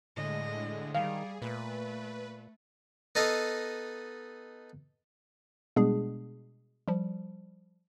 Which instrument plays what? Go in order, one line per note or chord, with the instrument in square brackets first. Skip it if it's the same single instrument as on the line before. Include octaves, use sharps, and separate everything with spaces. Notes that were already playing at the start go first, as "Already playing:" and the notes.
[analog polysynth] A2 D3 G#3 [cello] D#5
[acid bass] D#3 [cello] G3 [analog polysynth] G#4 [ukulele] F5
[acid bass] A#2 [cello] A3 [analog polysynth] B4
[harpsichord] B3 D#4 A4 D#5 F5
[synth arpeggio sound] B2 G3 G#3 B3 D4 G#4
F3 G3